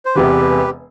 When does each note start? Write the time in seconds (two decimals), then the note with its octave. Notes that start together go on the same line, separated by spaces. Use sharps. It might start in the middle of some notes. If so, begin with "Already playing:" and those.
0.05 C5
0.15 E1 E2 C3 E3 G4 B4